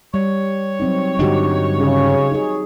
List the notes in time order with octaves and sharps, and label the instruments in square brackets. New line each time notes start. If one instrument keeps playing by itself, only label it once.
[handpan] G3 [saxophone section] C#5
[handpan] F#3 C4 D#4
[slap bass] G2 D3 D4 [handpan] D#4 F#4 G4
[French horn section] C#3
[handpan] D#4 G#4